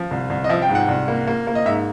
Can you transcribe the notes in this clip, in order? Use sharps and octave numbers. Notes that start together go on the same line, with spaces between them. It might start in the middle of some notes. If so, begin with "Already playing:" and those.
Already playing: F3
C2
C2
D#5
F3 E5
G5
G#2
F#5
C2
A#3
A#3
A#3
D#5
G#2 E5